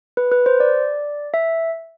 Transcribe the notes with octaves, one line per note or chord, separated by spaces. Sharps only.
B4
B4
C5
D5
E5